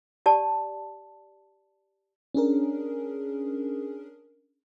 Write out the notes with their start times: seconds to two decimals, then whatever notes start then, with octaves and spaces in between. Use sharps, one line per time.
0.26 G4 D5 A5
2.35 C#4 D4 G#4 A#4